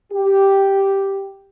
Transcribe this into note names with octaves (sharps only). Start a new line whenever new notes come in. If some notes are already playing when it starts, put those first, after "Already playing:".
G4